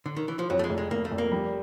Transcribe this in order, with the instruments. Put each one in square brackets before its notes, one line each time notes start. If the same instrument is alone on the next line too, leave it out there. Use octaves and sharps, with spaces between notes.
[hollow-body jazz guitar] D3
D#3
E3
F3
[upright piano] F2 [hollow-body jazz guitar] F#3
[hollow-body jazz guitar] A3
G#3
[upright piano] F1
[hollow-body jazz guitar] G#3
[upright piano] F1 [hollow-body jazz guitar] A#3
[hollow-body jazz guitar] A3
[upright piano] F1
[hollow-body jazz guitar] A#3
[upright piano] G3